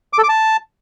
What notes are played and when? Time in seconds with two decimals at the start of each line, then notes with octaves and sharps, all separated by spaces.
0.13 D6
0.18 A4
0.24 D6
0.29 A5